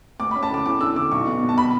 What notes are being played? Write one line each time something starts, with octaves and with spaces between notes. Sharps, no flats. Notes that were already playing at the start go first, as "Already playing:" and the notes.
D2 D6
B5
C#4
A5
D3 D6
E2 D6
D4 E6
D3 D6
B1 C#6
B3
B2
A5
B5